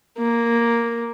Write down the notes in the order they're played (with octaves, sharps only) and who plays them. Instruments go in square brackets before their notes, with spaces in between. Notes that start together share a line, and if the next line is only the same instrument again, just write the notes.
[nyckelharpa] A#3